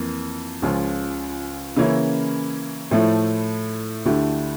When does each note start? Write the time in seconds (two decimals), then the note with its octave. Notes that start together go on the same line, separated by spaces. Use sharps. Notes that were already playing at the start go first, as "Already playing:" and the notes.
Already playing: F2 E3 A#3
0.62 C#2 C#3 F3 C#4 F4
1.76 C#3 E3 A#3 C#4 E4
2.91 A2 F3 A3 E4
4.05 D2 D3 A3 E4 G4